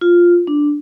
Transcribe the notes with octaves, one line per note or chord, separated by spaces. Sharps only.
F4
D4